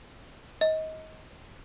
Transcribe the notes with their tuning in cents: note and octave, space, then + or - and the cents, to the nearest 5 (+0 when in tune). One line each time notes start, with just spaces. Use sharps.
D#5 +25